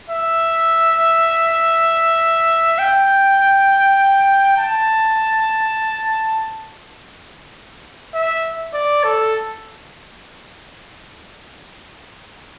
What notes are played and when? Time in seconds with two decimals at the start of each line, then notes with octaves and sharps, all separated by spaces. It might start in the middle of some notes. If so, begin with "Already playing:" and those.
0.10 E5
2.79 G5
4.57 A5
8.14 E5
8.74 D5
9.04 A4